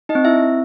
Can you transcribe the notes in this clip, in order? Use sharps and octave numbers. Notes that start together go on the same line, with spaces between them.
D#4 D#5
C4
E4 E5
C4